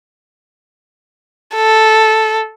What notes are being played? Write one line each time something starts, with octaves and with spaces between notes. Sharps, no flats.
A4